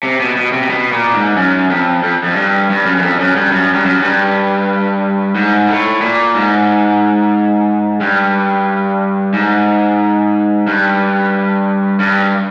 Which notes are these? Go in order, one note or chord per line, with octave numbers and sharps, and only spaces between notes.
C3
B2
B2
C3
C3
B2
A#2
G#2
F#2
F2
F2
F2
G2
G2
F#2
F#2
F2
F#2
G2
F#2
G2
F#2
G2
G#2
A2
A#2
G#2
G2
G#2
G2
G2